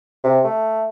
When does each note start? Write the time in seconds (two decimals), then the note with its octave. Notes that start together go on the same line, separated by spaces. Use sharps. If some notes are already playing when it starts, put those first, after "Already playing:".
0.24 C3
0.44 A3